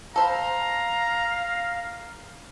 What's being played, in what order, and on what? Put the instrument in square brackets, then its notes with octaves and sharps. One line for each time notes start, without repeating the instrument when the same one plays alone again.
[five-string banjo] A4 C5 B5 [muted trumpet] F5 [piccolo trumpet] A#5